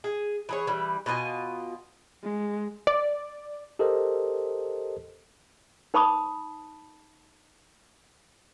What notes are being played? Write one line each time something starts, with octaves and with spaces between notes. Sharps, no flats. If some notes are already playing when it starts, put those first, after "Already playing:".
G#4
E3 G#4 C#5
E3 G3
B2 F4 D#5 G#5
G#3
D5
G4 A4 A#4 C5 D#5
D#4 C5 A5 B5 C#6 D#6